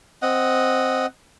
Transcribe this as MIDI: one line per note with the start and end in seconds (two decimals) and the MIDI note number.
0.22 1.06 60
0.22 1.06 75
0.22 1.06 78